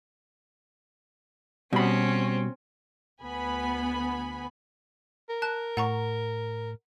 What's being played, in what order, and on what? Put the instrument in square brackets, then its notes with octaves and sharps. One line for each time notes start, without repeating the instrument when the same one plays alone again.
[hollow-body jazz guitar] B2 B5 [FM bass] G3 [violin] C4 C#4
[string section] D2 B3 G#5 B5
[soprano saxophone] A#4
[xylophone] A5 F#6
[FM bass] A2 [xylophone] F#5 A#5 C#6